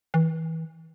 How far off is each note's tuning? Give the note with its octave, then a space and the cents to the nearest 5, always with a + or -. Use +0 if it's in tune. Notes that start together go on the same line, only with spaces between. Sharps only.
E3 -30